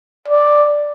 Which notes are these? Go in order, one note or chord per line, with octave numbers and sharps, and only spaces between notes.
D5